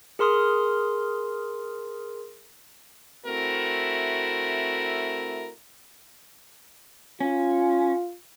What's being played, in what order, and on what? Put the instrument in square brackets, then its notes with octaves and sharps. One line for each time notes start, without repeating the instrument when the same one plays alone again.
[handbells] G#4 A#4 C6 D#6 F6
[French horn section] A3 C4 E4 F#4 A#4
[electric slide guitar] C#4 [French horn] F4